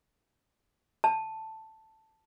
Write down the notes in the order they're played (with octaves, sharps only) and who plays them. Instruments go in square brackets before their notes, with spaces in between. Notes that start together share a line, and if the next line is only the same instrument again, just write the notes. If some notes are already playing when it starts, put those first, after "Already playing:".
[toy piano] A5